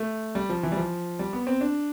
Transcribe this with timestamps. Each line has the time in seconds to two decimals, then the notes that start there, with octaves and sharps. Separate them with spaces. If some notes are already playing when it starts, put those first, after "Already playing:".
Already playing: A3
0.35 G3
0.50 F3
0.63 E3
0.72 G3
0.77 F3
1.19 G3
1.33 B3
1.47 C4
1.61 D4